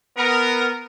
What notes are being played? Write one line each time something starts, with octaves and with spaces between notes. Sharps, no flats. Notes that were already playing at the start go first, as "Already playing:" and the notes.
B3 A#4